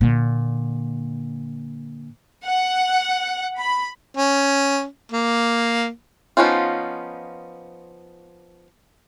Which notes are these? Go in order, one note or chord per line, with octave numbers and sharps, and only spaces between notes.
A#2 D3
F#5
B5
C#4
A#3
F3 B3 C#4 D#4 F4